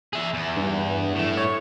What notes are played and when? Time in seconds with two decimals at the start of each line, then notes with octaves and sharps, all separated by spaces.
0.13 G#4 E5
0.34 E2
0.57 G2
1.15 A2 A3
1.37 C#5